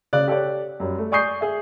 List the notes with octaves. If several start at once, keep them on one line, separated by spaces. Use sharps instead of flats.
C#3 D5 F#6
G4 A4 C#5 D5
F#2 G3
A3
D5 G#5 C#6 D#6 G6 C7
G#4 E5